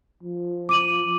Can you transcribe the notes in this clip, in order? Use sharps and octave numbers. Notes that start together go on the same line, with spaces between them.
F3
D6 D#7 F#7